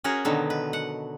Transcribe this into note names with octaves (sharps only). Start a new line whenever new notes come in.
C#4 F#4 G#4 A#4
B2 D3 D#3 F#3 B3
B4
F#5